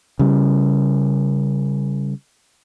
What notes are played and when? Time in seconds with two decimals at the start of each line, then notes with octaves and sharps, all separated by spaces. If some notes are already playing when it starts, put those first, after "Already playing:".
0.19 C#3 G3